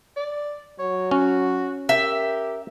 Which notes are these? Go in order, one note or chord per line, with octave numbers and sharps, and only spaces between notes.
D5
F#3 C#5
C#4 F#4
G4 A#4 E5 G5